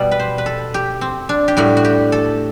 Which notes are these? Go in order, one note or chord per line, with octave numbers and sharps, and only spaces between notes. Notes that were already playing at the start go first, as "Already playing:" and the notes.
Already playing: B2 G3 D5
B4
C5
B4
A4
G4
C4
D4
G4
A2 G3 F#4
F#4
G4
A4